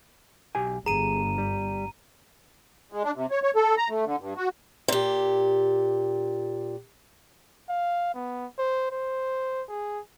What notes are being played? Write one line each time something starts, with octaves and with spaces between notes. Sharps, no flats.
B1 G4 G#5
G1 G#4 A#5 D#7
G3
G#3
D4
C3
C#5
C#5
A4
A#5
A3
D3
G2
F#4
A#2 G4
F5
B3
C5
C5
G#4